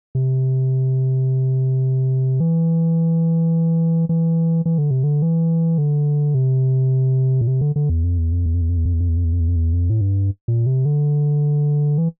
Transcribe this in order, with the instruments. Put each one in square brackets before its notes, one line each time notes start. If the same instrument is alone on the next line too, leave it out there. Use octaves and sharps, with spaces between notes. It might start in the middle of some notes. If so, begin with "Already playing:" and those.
[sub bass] C3
E3
E3
E3
D3
C3
D3
E3
D3
C3
A#2
C3
D3
D3
E2
F2
E2
F2
E2
F2
E2
F2
E2
F2
E2
F2
E2
F2
E2
F2
E2
F2
E2
F2
A2
G2
A#2
C3
D3
E3